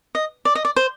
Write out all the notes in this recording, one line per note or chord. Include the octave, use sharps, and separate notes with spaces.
D#5
D5
D#5
D5
C5